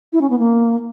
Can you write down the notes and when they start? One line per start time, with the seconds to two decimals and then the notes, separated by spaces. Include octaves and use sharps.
0.13 E4
0.21 C#4
0.30 B3
0.39 A#3